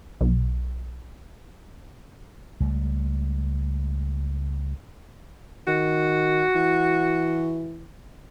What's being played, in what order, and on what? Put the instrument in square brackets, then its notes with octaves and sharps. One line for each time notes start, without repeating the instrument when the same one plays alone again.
[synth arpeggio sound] B1
[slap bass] C#2 G3 A3
[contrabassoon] D#3 [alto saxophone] F#4
[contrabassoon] E3